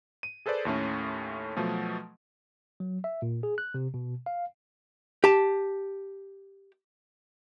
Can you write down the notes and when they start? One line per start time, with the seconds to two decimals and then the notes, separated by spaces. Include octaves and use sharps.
0.23 D#7
0.46 G#4 A4 B4 C5 D5
0.65 D#2 A2 A3 C#4
1.56 B2 F3 F#3 A3
2.80 F#3
3.04 E5
3.22 A#2
3.43 G#4
3.58 F#6
3.74 C3
3.94 B2
4.26 F5
5.24 G4 A5